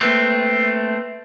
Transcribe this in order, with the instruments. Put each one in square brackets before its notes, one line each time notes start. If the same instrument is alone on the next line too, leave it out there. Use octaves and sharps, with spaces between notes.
[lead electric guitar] A3 C4 [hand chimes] A#3 B4 F#6